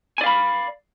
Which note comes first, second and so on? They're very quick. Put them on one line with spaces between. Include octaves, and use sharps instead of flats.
G#5 D5 F5 B5